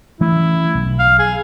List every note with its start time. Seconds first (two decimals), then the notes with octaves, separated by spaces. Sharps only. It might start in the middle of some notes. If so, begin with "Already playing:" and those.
0.21 E3 A3 C#4 E4
0.75 B1
0.99 F5
1.19 G#4